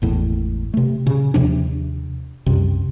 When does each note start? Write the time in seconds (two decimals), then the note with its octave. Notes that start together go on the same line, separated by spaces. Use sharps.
0.02 G#1 E2 A2
0.74 C3 A3
1.06 A#2 C#3
1.34 D#2 C3 F3 D4
2.46 C2 F#2 C3